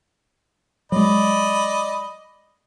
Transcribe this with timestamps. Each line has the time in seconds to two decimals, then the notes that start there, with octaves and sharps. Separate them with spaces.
0.92 F#3 G#3 D5 D#5 B5